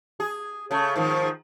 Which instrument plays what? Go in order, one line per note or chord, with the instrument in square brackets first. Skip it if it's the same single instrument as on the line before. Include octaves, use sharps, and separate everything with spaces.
[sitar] G#4
C#3 A3
G#2 D#3 F3